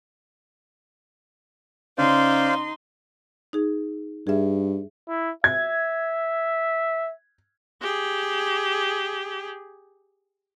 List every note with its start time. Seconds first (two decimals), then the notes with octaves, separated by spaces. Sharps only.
1.98 C#3 C#4 D#4 C5 D5 F5 C6
3.53 D#4 G#4
4.27 G2 G#4 E5
5.08 E4
5.44 E5 G#6
7.81 G4 G#4